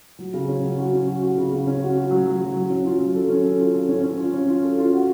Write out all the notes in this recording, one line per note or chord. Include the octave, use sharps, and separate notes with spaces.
F#3
C#3
C#4
F#3
F#4
C#4
F#4
F#4
C#3
C#3
C#4
F#4
F#4
F#3
F#3
F#3
F#3
C#4
F4
F#3
A4
C#4
A4
F4
A4
C#4
C#4
F4
C#4
F4
A4
F4
F#4